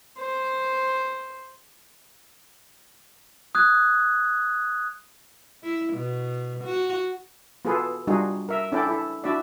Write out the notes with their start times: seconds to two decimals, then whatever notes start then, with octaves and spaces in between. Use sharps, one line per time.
0.18 C5
3.55 D#6 F#6 G#6
5.63 E4
5.94 B2
6.64 F#4
7.65 B3 F4 F#4 G#4 A4 B4
8.07 G3 D4 D#4 F4 F#4 G#4
8.49 A#4 E5
8.72 C#4 D4 E4 A4 D5 G5
8.87 E4 A4
9.24 D4 E4 F#4 D5 E5